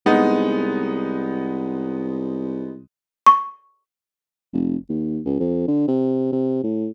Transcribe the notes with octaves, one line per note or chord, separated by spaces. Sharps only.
C2 G#3 B3 D#4
C#6
F1
D#2
C#2
F2
D3
C3
C3
A2